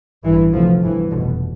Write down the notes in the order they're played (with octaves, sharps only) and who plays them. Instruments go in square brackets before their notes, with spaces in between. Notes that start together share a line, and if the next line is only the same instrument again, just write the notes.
[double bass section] A1 G2 E3
D2 C3 F3
G1 G2 E3
F1 E2 B2 D3